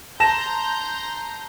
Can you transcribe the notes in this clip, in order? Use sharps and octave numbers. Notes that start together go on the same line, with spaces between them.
A5 A#5 C6 G6 A#6 E7